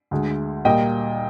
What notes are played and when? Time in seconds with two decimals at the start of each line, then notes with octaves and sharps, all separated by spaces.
0.11 D2 D3 G#3
0.65 A#2 G3 A#3 D#5 G5